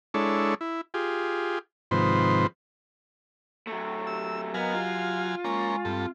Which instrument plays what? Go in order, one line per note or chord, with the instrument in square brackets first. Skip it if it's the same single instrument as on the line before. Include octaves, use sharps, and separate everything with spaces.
[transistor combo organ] G#3 D4 E4 A4 C#5
E4
F4 G4 G#4
G#2 C3 D#3 F3 B4 C5
[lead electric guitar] F#3 A3
[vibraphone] G4 [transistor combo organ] E6
[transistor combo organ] F#3 F5 G#5 [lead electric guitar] B3 [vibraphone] A#4 D#5 A#5
[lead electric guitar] F4 [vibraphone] G4
[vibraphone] G#3 G#5 C#6 [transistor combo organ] A#3 C#4
[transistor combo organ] G2 A4 [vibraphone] C4